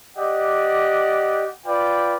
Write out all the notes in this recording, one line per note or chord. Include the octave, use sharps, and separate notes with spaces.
G4 D5 D#5 F#5
F4 B4 D5 G5